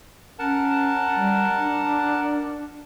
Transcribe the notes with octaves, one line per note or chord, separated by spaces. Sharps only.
C#4 A#4 F#5 A5
G3
D4